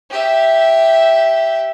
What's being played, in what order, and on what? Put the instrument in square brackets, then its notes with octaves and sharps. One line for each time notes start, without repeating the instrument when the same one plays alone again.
[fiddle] G4 E5